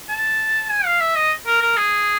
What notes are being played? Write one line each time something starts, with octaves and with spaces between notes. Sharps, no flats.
A5
G#5
F5
E5
D#5
A#4
A#4
G#4